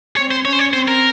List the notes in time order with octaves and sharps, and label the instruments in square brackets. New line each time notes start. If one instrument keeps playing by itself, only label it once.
[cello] C4 [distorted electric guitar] C#5
[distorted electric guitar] C5
[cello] C#4 [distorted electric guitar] C#5
[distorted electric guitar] C5
C#5
[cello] C4 [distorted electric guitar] C5
[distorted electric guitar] A#4